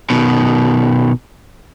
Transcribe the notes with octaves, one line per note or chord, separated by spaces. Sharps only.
B2 D#3